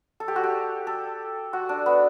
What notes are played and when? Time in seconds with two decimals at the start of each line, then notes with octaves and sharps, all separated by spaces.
0.20 A4
0.28 G4
0.36 F#4
0.43 G4
0.87 A4
1.53 F#4
1.69 D4
1.86 B3